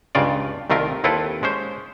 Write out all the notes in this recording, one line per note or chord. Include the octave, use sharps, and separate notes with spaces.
C#2 G2 C#3 F4 D5
C2 D#3 A3 F4 A#4
D#2 C4 E4 F4 A4 B4
G#3 C#4 C5